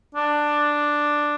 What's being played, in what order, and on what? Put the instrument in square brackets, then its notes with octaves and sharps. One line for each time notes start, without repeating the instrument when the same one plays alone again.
[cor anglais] D4